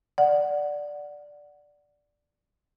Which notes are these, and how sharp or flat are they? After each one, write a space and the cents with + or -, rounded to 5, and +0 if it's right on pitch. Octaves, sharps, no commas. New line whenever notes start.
D5 +0 F#5 +0